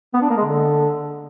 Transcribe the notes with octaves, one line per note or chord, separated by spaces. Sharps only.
B3
D4
A#3
G#3
D3